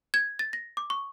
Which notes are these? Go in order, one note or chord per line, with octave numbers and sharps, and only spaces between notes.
G#6
A6
A#6
D6
C#6